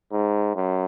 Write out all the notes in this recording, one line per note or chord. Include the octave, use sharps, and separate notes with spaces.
G#2
F#2